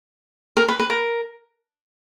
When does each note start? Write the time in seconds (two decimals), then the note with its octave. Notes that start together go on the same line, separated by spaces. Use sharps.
0.57 A#4
0.68 B4
0.79 B4
0.90 A#4